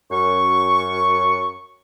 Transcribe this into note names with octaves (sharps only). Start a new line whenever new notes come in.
F#2 C#6